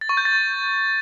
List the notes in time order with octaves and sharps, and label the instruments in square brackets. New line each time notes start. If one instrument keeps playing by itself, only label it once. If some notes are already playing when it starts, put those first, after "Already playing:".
[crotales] A6
C#6
G6
A6